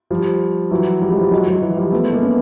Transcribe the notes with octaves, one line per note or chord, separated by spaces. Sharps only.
F3 G3
E3 F#3
F3 G3
F#3 G#3
F3 G3
F#3 G#3
F#3 G#3
E3 F#3
F3 G3
A3 B3
G#3 A#3
B3 C#4